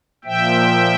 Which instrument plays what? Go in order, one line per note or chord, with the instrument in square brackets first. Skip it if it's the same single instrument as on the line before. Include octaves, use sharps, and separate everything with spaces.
[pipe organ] A#2 F3 E5 G5